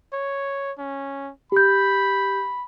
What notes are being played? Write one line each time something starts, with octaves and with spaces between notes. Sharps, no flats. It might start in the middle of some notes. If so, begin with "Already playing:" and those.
C#5
C#4
G4 B5 G6